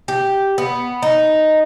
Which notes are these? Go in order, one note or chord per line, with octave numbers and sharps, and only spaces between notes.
G4
B3
D#4